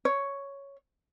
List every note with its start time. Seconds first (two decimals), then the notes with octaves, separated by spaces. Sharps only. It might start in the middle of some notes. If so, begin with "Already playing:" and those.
0.05 C#5